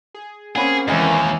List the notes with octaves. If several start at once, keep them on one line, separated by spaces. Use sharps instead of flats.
G#4
A#3 C4 C#4 G#4 C#5 F#5 B5
D#2 C#3 E3 G#3 D#5 E5 G#5